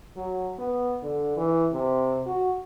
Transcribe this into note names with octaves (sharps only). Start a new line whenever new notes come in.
F#3
B3
D3
E3
C3
F#4